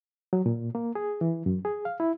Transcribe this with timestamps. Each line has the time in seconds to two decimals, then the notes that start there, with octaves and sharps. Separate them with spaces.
0.33 F#3
0.46 A#2
0.75 A#3
0.95 G#4
1.21 E3
1.46 F#2
1.65 G#4
1.85 F5
2.00 E4